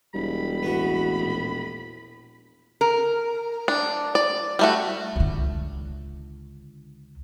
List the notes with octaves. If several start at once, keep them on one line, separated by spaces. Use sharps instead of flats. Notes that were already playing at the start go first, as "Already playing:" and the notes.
E1 G3 B5
A1 B3 F#4
A#1
A#4
D4
D5
G3 A3 F#4
C#2 D3